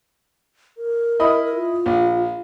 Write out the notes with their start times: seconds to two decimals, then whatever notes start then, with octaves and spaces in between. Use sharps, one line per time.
0.78 A#4
1.20 E4 D#5 B5
1.55 F4
1.86 A#1